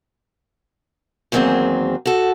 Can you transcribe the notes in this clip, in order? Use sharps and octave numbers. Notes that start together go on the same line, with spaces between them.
E2 D#3 F#3 A#3 C4 G#4
F#4 A4